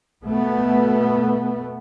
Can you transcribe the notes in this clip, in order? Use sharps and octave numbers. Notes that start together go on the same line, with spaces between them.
B2 A3 B3